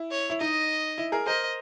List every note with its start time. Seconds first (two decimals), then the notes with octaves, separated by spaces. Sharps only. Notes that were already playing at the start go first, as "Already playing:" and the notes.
Already playing: E4
0.12 C#5
0.30 E4
0.41 D#4 D#5
0.98 E4
1.12 G#4 A#4
1.27 A#4 C5 D#5